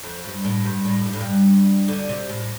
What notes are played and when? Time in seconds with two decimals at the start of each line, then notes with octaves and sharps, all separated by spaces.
0.03 F2
0.24 G2
0.45 A2
0.64 G2
0.85 A2
1.06 G2
1.13 A2
1.21 G2
1.88 D2 D3
2.09 C3
2.29 A2